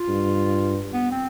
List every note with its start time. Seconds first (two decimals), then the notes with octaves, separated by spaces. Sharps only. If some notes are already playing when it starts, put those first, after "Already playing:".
Already playing: F4
0.08 G2
0.94 B3
1.12 C4